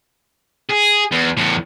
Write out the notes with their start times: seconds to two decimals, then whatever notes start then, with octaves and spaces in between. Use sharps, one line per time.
0.70 G#4
1.12 E2
1.37 E2 A2